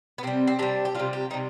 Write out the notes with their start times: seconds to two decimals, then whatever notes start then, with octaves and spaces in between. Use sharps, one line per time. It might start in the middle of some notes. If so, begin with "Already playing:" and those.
0.18 B3
0.23 C3 G3 C4
0.47 C4
0.59 C3 G3 D4
0.85 G4
0.95 C3 G3 F4
1.13 G4
1.30 G3 D#4
1.34 C3